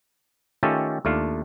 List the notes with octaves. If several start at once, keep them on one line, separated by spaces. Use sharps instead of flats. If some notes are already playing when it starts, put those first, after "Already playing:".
D#3 A3 C#4 F4 G4 A4
D#2 A3 D4 F4 F5